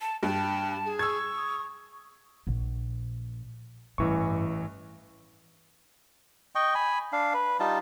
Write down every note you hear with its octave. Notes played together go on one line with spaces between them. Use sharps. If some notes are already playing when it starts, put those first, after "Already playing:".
A5
G2 G5 A5
G#4
C#6 E6 G#6
D#6
A#1
A1 G2 E3 C#6
D#5 G5 C#6
G#5 B5
D4 F5
B4
G3 D#4 F4 A5